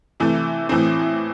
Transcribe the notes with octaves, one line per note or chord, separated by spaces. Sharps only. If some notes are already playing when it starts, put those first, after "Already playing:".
C3 E3 A3
A2 E3 A3 C4